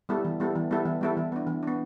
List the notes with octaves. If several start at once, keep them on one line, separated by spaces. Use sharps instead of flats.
G3 B3 E4 A4
E3
G3 B3 E4 A4
E3
G3 B3 E4 A4
E3
G3 B3 E4 A4
E3
B3 D4
E3
B3 D4